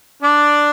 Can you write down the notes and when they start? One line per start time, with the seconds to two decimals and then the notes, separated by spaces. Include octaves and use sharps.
0.22 D4 D5